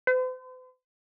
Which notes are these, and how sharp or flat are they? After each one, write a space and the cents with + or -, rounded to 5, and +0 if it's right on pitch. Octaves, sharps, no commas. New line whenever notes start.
C5 -45